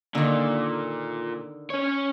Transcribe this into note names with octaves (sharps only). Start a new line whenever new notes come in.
A#2 D3 D#3
C#4 C#5